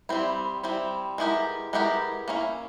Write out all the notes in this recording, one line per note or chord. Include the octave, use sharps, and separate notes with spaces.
G3 C4 E4
G3 C4 E4
G#3 B3 E4 G4 A#4
G#3 B3 E4 G4 A#4
A#3 C#4 E4